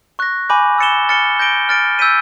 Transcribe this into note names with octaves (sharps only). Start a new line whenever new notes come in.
C#6 F#6 A#6
G#5 B5 D6 G6
E6 A6 C#7 E7 G7
F6 A6 C#7 E7 G7
G6 A#6 D7 G7
F6 A6 D7
E6 G6 B6 D#7